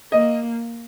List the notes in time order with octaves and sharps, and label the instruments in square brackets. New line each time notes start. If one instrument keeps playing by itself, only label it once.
[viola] A#3 [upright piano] D#5